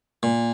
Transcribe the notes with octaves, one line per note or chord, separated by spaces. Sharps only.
A#2